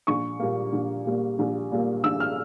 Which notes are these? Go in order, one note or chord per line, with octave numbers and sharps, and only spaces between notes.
A#1 C#6
A#2 G3 A#3
A#1
A#2 G3 A#3
A#1
A#2 G3 A#3
A#1 E6
F6